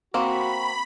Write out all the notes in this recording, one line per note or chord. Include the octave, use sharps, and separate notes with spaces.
A#3 C4 F#4 B5